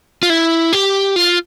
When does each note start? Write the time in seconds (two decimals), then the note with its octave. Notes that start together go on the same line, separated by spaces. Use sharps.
0.23 F4
0.30 E4
0.73 G4
1.16 F4